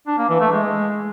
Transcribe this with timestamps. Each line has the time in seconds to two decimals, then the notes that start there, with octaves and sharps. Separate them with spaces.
0.07 D4
0.18 A#3
0.29 E3
0.41 A3
0.52 G#3